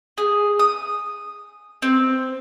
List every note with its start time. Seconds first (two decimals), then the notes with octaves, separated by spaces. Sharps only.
0.18 G#4
0.59 D#6
1.82 C4